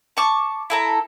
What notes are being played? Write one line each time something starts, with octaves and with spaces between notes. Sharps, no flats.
A5 C#6 D6
E4 A4 A#5